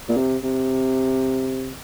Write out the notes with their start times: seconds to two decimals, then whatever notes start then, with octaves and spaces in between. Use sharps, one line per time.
0.09 A#2
0.17 C3
0.43 C3